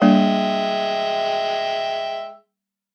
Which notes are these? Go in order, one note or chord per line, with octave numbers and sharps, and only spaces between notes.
G3 G#3 A#3 D4 E5 G5